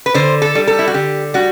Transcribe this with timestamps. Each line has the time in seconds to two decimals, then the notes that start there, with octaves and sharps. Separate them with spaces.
0.06 B4
0.14 D3 C5
0.42 A4
0.55 G3
0.67 A4
0.79 E4
0.87 F#4
0.94 D3 G4
1.34 G3 F#4